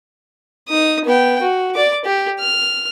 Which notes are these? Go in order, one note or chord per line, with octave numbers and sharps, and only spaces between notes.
D#4 D#6
B3 G5
F#4
D5 D6
G4
F6